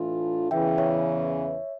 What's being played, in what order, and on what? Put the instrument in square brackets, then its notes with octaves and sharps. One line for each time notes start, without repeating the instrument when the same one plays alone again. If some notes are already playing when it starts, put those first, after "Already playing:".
Already playing: [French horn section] A2 E3 A3 D4 F4
[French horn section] E2 C#3 E3 [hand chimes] E5 G5
[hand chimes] C#5 E5